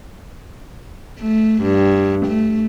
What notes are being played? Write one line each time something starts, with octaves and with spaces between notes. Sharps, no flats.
A3
G2
A3